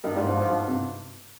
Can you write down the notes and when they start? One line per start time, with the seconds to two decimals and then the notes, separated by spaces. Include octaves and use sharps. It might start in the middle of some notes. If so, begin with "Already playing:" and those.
0.04 G2 D#3
0.16 G#2 G3
0.28 G#2 F3
0.41 F3
0.50 G2
0.68 C3